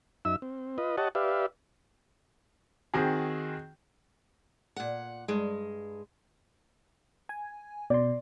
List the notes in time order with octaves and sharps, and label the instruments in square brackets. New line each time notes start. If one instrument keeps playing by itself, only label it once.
[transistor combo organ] F#2 D#4 E5 E6
C4
F4 B4 D#5
G4 C#5 D#5 F#5 A5
G4 B4 D5 E5 F5
[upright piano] D#3 C4 F#4 G#4
[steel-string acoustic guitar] A#2 F#5
G2 G#3
[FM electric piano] G#5
[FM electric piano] B2 C6 [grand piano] D5